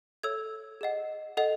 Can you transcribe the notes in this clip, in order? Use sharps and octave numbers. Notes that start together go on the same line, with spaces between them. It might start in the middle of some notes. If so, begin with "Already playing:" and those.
A4 C#5 E5 E6 G#6
G#4 D#5 F#5
A4 D#5 F#5